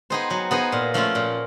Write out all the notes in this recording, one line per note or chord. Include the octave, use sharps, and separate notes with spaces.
B3 D#4 G#4 C5
F#3
B3 D#4 G#4 C5
A#2
F3 A3 C#4 F4
A#2